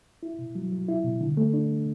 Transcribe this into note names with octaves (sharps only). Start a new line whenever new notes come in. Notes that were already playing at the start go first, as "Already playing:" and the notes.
E4
B2
F#3
F#3
E4
B2
D3
A3
D4